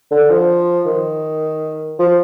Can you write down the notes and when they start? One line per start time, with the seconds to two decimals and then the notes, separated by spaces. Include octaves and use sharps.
0.11 D3
0.30 F3
0.86 D#3
1.99 F3